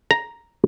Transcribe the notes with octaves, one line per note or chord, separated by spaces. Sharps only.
A#5